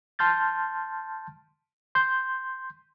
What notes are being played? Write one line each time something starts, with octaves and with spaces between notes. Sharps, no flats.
A5 C6 F6 G6 A6
C6 G6